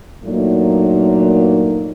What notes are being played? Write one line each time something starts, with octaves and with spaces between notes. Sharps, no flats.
G2 A#2 F#3 A3 A#3 D#4